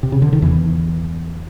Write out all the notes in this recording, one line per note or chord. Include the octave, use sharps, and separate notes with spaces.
C3
C#3
D3
D#3
E2 E3